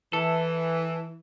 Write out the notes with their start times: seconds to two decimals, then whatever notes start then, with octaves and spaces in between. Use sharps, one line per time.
0.13 E3 A4